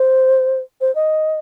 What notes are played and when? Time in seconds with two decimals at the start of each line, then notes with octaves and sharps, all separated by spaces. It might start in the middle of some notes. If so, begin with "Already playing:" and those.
Already playing: C5
0.81 C5
0.95 D#5